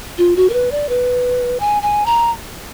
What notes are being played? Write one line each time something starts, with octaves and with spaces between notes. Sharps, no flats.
F4
F#4
A#4
B4
D5
B4
G#5
G#5
A#5